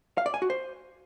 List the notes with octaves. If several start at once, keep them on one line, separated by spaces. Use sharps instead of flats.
F5
D5
G#5
F#4
C5